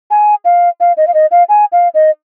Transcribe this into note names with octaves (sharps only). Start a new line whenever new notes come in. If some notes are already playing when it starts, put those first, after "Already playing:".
G#5
F5
F5
D#5
F5
D#5
F5
G#5
F5
D#5